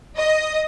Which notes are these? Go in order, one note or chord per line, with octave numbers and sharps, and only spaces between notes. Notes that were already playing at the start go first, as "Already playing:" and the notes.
D#5